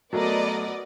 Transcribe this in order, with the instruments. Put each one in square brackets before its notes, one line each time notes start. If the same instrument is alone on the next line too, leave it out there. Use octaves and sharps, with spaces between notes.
[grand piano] F#3 A3 A#4 [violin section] B3 D5 D#5